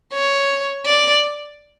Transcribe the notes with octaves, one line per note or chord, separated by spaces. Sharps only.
C#5
D5